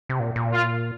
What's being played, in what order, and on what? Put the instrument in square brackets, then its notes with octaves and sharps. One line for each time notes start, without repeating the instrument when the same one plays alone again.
[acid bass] C3
A#2
A#2
[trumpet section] F4